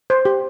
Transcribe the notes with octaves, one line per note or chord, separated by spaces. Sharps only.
C5
G4